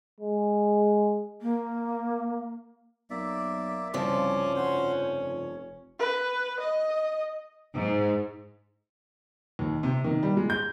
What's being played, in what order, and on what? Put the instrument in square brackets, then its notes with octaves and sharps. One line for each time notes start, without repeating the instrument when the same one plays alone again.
[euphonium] G#3
[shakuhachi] A#3
[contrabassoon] B1 [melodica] A#3 D5 E5
[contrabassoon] C2 [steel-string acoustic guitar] G2 C#3 F3 [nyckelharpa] C#4 [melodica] A5 C6 D6
[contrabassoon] F1 [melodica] F#4 C5 C6
[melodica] C#5
[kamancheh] B4
D#5
[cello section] G#2
[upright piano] D#2
C3
D#3
G3
G#3
G6